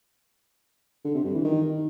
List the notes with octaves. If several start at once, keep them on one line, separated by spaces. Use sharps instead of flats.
D3
C3
G2
E3
D#3